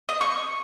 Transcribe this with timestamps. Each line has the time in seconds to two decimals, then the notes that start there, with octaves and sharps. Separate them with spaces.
0.09 D#5
0.21 C#6